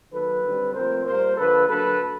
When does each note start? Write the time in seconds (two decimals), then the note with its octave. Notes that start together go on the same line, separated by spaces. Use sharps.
0.12 D#3 F#3 A#3 A4 B4
0.43 D3 G3 C4
0.74 A#2 F3 A3 C4 A#4 C5
1.05 A#2 G3 A#3 A#4 C5
1.37 D3 F3 A#3 A4 B4
1.68 D3 F#3 A#3 A4 B4